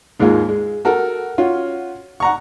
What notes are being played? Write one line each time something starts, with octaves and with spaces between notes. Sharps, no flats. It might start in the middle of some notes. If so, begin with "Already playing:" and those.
D#2 G#2 G#3 A#3 F4
G#3
F#4 A4 A#4
C#4 F4 F#4
F#5 A#5 C#6